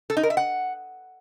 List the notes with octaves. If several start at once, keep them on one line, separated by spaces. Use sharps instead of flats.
A4
D#4
A#4
E5
F#5